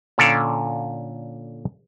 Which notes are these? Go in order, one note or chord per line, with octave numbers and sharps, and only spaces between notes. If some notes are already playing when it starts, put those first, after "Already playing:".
A#2 D3 C#4 A4 D5 F5